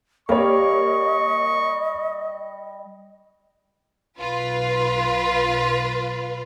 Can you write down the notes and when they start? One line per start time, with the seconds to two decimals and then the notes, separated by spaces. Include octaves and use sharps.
0.29 G3 A#3 C#5 D#5 C#6
4.19 B1 F4 B4